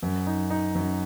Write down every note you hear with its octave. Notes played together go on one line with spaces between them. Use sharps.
F#2
D#4
D#4
F#2